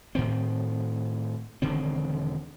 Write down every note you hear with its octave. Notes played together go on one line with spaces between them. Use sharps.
A2 D#3 C4
E1 D3 D#3 C4